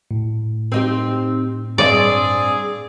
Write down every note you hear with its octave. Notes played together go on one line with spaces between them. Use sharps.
A2
C4 D#4 G4
G2 C4 G#4 D5 D#5